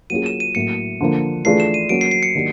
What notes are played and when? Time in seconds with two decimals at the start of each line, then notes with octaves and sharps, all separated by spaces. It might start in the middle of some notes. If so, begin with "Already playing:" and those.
0.10 F#3 A#3 C#4 F4 G#4 D#7
0.26 E7
0.40 D#7
0.55 A2 F#3 A#3 C#7
1.00 D3 F3 A#3
1.45 E3 A3 D4 F4 G#4 C7
1.60 E7
1.74 D#7
1.89 F#3 A#3 C#4 D7
2.01 C7
2.11 C7
2.23 C#7
2.35 D#3 F#3 A#3 D4 G4